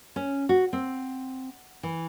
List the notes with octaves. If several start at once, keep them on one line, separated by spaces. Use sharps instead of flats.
C#4
F#4
C4
E3